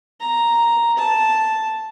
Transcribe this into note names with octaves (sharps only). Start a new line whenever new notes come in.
A#5
A5